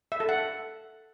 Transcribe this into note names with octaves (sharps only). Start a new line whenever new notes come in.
E5
A4
F#5